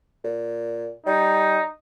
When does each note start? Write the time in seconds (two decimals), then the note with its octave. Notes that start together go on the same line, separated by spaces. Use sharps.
0.24 A#2
1.06 G3 D#4